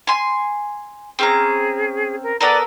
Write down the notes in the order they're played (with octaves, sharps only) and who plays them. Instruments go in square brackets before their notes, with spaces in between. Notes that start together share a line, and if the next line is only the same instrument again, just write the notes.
[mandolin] G#5 C6
[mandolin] C4 C#4 A#5 [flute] G#4
[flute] A#4
[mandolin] B3 A4 A#4 [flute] D5